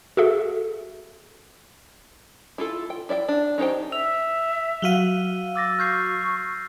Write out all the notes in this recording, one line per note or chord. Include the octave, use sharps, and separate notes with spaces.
F#4 G#4 A4 E5
E4 F4 A4
G5
E4 D5 E5 G5
D4
C#4 D#4 G4 C5 G5
E5 E6 F7
F#3 F#4 F5 D#7 G7
D6 E6 A6 A#6
C#6 F6 G6 C7